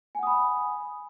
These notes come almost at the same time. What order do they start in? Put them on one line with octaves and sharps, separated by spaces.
G#5 F#5 D#6 B5